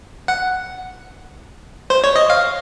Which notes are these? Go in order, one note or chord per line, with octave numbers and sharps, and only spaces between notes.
F#5
C5
C#5
D#5
F5